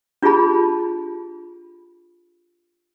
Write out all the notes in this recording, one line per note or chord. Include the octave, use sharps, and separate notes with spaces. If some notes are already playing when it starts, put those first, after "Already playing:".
D4 F4 G4 G#4 A5 B5